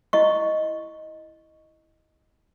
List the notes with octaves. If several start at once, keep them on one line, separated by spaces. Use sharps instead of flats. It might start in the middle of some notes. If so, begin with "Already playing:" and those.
E4 D#5 C#6